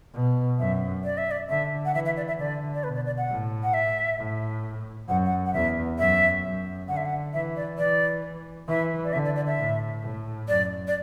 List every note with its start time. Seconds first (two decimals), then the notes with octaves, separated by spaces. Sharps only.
0.14 B2
0.59 F#2 E5
1.04 D5
1.18 E5
1.31 D5
1.49 D3 E5
1.85 F#5
1.94 E3 E5
2.06 E5
2.17 D5
2.28 E5
2.38 D3 D5
2.74 D5
2.84 B2 B4
2.95 D5
3.06 D5
3.18 F#5
3.29 A2
3.63 F#5
3.74 E5
4.19 A2
5.08 F#2 F#5
5.25 F#5
5.46 F#5
5.54 E2 E5
5.99 F#2 E5
6.44 F#2
6.88 D3 F#5
6.97 E5
7.05 F#5
7.33 E3 E5
7.56 D5
7.78 E3 D5
8.68 E3 E5
9.04 D5
9.13 D3 E5
9.25 D5
9.36 D5
9.47 E5
9.58 A2
10.03 A2
10.48 F#2 D5
10.87 D5